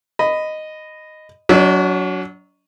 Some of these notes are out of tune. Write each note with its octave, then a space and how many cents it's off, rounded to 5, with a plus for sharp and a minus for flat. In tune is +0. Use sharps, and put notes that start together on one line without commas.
D#5 -5 B5 +15
F#3 +5 D4 -40 D#5 +0